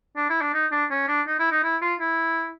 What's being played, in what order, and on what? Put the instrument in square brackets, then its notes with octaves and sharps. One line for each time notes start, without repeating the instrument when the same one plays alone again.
[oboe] D4
E4
D4
D#4
D4
C#4
D4
D#4
E4
D#4
E4
F4
E4